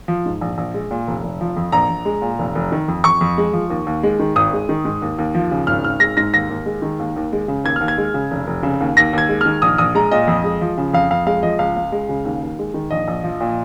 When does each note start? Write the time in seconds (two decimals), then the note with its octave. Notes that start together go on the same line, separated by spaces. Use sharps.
0.08 F3
0.26 G#2
0.41 A#1
0.58 A#1
0.74 G#3
0.91 A#2
1.08 F1
1.23 F1
1.41 F3
1.56 F2
1.72 A#1 A#5
1.89 A#1
2.05 G#3
2.22 A#2
2.39 F1
2.55 F1
2.72 D#3
2.88 F2
3.04 F2 C#6
3.21 F2
3.38 G#3
3.53 F3
3.70 D#2
3.87 D#2
4.03 G#3
4.19 D#3
4.36 G#1 D#6
4.53 G#3
4.69 D#3
4.85 G#2
5.02 D#2
5.18 D#2
5.35 F3
5.51 C#3
5.67 G#1 F6
5.84 G#1 F6
6.00 G#3 A#6
6.17 G#2 A#6
6.33 D#2 A#6
6.49 D#2
6.66 G#3
6.82 D#3
6.99 D#2
7.16 D#2
7.32 G#3
7.48 C#3
7.64 D#2 G#6
7.76 D#2 F6
7.88 G#6
7.98 G#3
8.14 C#3
8.31 F1
8.47 F1
8.63 C#3
8.81 D#2
8.97 D#2 A#6
9.13 D#2 G#6
9.29 G#3
9.41 D#3 F6
9.62 A#1 D#6
9.78 A#1 D#6
9.95 G#3 A#5
10.11 A#2 D#5
10.28 F2
10.44 G#3
10.61 F3
10.78 C#3
10.93 F2 F5
11.10 F2 F5
11.27 G#3 F5
11.43 F3 D#5
11.59 C#2 F5
11.77 C#2
11.92 G#3
12.09 C#3
12.25 D#2
12.42 D#2
12.59 G#3
12.74 D#3
12.91 A#1 D#5
13.08 A#1
13.23 F3
13.41 A#2